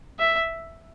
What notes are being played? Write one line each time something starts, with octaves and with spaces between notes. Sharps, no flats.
E5